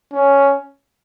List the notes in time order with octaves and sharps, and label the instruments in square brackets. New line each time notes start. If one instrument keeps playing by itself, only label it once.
[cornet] C#4